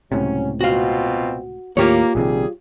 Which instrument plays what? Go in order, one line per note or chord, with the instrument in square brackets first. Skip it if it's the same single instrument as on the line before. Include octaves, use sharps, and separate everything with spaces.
[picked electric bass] C#2 A2 C3 [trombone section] F#3 C#4
[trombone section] B2 C4 F4 [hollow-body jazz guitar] F#4 F5
[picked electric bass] D#2 A2 [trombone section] A#3 [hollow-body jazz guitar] F4 G4 C#5
[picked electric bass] A#1 C3 D#3 [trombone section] G3 G#4